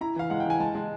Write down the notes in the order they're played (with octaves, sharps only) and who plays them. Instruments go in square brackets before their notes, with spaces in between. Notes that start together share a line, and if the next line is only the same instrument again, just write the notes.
[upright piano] E4 [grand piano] A#5
[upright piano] E3 [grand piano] F5
[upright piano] G#3 [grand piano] F#5
[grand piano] G5
[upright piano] E3 [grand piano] G#5
[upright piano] G#3 [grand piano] A5
[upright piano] G#3